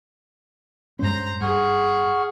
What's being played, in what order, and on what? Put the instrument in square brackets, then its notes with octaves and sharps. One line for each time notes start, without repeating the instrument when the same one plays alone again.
[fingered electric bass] G2 G#3 C#4 [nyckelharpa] C5 A#5
[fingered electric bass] G2 [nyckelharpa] G#4 [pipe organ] F#5 C#6 F6